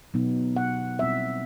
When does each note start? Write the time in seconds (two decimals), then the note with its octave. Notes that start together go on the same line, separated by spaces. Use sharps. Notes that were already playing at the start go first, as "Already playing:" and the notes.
0.14 B2 F#3 B3 D#4
0.56 F#5
0.99 B2 G3 C4 E5